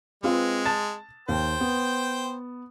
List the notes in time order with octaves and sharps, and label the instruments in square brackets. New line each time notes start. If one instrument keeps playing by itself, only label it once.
[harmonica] G#3 [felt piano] C4 F4 B4
[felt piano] A5 A6 E7
[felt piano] D#2 [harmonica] C5 G5
[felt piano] B3